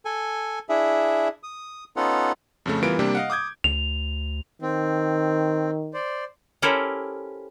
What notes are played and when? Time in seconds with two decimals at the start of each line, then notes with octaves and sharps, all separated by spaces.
0.05 A4 G#5
0.69 D4 E4 G#4 E5
1.43 D#6
1.97 B3 C#4 D#4 F4 A4 F#5
2.66 F2 C#3 A3
2.83 E3 G3 B3 F4 A#4 D7
2.99 C3 G3 A#3 D4 G4
3.15 D#5 F5 F#5
3.30 D6 D#6 G6 G#6
3.64 D2 F7
4.62 D#3 C4
5.94 C5 D5
6.62 C#4 E4 G4 A4 A#4 C5